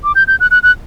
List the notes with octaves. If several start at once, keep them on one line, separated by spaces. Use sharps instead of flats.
D6
G6
G6
F#6
F#6
F#6